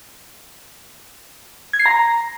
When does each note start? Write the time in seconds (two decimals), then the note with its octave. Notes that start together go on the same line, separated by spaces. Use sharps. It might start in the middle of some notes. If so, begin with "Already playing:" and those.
1.73 G#6
1.80 C7
1.86 A#5